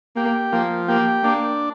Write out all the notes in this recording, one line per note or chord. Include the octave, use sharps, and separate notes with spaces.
A#3 G4
F3 A#3
A#3 G4
A#3 D4